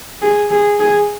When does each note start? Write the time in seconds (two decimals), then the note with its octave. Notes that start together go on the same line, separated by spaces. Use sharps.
0.22 G#4
0.50 G#4
0.80 G#4